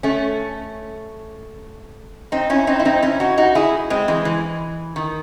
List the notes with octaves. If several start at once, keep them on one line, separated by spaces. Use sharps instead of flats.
A3 C#4
C4 D#4
C#4 E4
C4 D#4
E4
C4 D#4
C#4 E4
D#4 F#4
D#4 F#4
E4 G#4
G#3 C4
E3 G#3
E3
D#3